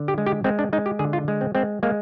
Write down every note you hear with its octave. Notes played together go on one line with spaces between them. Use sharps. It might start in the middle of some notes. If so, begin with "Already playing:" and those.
Already playing: D3
G4
G#3
G4
G#3 C4
D4
G#3 D#4
G4
D3 G#4
F4
G#3
C4
G#3 C4
G#3 A#3